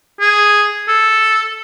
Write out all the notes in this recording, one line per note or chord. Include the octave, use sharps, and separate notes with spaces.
G#4
A4